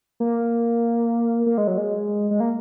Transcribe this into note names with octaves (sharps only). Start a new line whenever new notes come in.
A#3
A#3
G#3
F#3
G#3
G#3
A#3